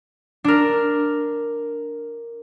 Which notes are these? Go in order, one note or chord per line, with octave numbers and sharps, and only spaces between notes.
D4 A#4